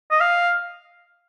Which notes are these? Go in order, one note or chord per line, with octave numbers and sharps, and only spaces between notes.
D#5
F5